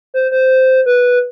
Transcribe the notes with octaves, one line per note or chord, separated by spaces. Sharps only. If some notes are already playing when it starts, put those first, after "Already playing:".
C5
C5
B4